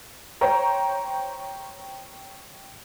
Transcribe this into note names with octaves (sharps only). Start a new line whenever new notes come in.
C5 C#5 G5 A#5